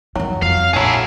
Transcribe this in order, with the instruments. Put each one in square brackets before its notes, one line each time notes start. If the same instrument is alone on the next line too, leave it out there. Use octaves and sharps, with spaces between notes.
[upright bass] F#2 E3 [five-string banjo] F#3
[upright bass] F2 [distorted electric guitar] F5
[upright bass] A#1 [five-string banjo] F#3 A4 [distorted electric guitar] E4 G#4